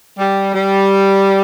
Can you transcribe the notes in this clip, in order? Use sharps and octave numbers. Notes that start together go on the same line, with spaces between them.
G3
G3